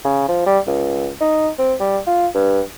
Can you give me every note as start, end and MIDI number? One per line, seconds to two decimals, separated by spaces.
0.04 0.28 49
0.29 0.42 53
0.47 0.59 55
0.67 1.08 37
1.21 1.49 63
1.58 1.74 60
1.80 1.98 55
2.07 2.27 65
2.35 2.61 43